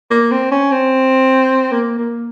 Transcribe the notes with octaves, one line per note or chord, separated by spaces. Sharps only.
A#3
C4
C#4
C4
A#3
A#3